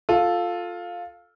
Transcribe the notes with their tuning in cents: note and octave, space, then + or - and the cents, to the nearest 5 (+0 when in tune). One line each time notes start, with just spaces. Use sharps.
F4 +10 A4 +0